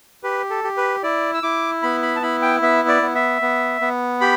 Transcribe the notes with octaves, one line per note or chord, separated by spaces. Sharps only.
G4 B4
A4
G4
B4
E4 D5
E6
E4 D6
B3 B5
B5
A5
E4 B5
G5
B3 E5
D5
B3
E5
B3
B3
G4 B5